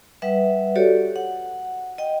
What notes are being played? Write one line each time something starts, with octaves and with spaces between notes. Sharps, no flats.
G3 B4 E5 F#5
F#4 G4 A4 C#5 D5
F#5
D#5 G5